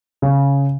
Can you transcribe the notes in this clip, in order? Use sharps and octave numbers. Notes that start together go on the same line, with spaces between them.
C#3